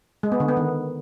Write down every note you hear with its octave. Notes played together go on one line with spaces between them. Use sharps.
G#3
B3
D3
B3
D#3